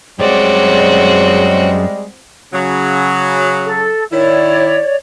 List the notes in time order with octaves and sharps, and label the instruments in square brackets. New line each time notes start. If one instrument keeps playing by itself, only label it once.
[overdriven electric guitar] F#2 D5 [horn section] G3 G#3 [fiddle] C4 F#4 [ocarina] C#5
[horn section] C#3 F#3
[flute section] A4
[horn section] D#3 E4 [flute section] C#5 D5